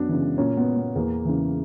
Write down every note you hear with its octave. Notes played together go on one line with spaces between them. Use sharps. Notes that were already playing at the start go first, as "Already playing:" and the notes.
Already playing: F#2 B3 D4
C#3 E3
A#2 A#3 C#4
B3
B3
E2 A#3
C#3 E3